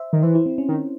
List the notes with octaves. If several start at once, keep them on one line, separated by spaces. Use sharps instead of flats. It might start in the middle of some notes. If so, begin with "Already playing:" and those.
Already playing: C5 E5
D#3
E3 C5
E4
C4
C#4
D#3